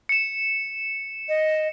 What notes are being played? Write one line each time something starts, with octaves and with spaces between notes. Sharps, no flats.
C#7 E7
D#5